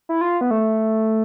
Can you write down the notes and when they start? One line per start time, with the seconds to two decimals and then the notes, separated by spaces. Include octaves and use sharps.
0.09 E4
0.21 F4
0.41 B3
0.51 A3